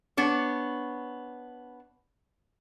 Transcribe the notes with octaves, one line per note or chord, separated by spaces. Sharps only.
B3 D4 C#5